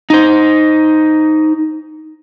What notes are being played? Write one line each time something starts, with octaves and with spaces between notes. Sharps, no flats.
D#4 C5